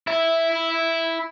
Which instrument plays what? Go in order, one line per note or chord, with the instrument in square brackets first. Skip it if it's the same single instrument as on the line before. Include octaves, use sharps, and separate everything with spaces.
[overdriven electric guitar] E4 E5